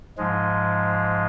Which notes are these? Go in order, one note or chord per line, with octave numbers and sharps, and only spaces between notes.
G#2 F3 G#3